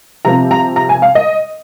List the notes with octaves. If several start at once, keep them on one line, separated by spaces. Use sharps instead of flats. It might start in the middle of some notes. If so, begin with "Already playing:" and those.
C3 F3 C4 A#5
A#5
A#5
G#5
F5
D#5